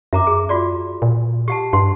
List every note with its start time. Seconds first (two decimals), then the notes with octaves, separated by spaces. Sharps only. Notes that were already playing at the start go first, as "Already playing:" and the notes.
0.13 F#2 E5 A#5 D6
0.27 G#4
0.49 F4 F#4 D5
1.02 A#2
1.48 G4 F#5 A5
1.73 G2 F#5 C6